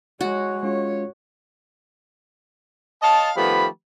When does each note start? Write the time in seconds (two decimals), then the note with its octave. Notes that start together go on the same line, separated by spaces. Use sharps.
0.21 G#3 F#4 C#5
0.63 G#3 C#4 F4 C#5
3.02 C#5 D#5 F5 A5
3.37 D#3 F3 A3 B3 G4 B5